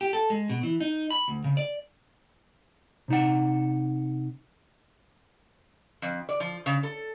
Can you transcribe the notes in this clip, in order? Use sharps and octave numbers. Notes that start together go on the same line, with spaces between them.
G4
A4
G#3
B2
E3
D#4
B5
D2
C#3
D5
C3 D#4 F#5
F2
D5
F3
C#3
A4